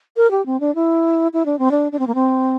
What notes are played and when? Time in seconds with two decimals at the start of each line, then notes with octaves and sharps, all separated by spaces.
0.17 A#4
0.31 G4
0.46 C4
0.60 D4
0.75 E4
1.33 E4
1.46 D4
1.59 C4
1.71 D4
1.92 D4
1.99 C4
2.07 A#3
2.15 C4